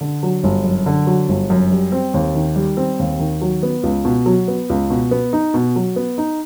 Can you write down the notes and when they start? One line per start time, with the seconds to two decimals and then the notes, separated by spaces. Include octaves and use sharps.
0.01 D3
0.23 F#3
0.44 G1
0.64 F#2
0.86 D3
1.07 F#3
1.29 G1
1.50 F#2
1.72 G3
1.92 C4
2.14 D#2
2.34 D#3
2.56 G3
2.77 C4
2.99 D#2
3.20 D#3
3.41 F#3
3.63 B3
3.83 C#2
4.05 B2
4.26 F#3
4.48 B3
4.70 C#2
4.90 B2
5.11 B3
5.33 D#4
5.54 B2
5.76 F#3
5.96 B3
6.18 D#4